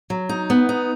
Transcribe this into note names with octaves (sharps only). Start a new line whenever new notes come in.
F#3
D#4
B3
D#4